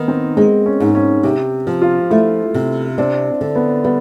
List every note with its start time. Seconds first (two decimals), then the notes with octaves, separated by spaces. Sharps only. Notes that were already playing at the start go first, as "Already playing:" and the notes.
Already playing: D#3 A#3 B3
0.08 C4
0.37 G#3 C4
0.66 C#4
0.80 G#2
0.95 C#4
1.23 C3 G4
1.67 F3
1.82 F4
2.10 A3 E4
2.54 C3
2.98 C4 D4
3.41 D3
3.56 B3
3.84 G3 B3